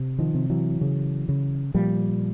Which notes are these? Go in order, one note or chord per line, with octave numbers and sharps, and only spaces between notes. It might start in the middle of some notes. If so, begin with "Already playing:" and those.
Already playing: C3
D#3 F3
C3
E3 F#3
C#3
C#3
A#2 F3 G3